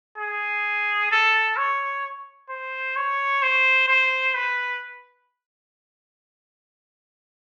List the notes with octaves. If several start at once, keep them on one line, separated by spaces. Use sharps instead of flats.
G#4
A4
C#5
C5
C#5
C5
C5
B4